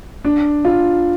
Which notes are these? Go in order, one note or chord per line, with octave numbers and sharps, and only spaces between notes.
D4
F4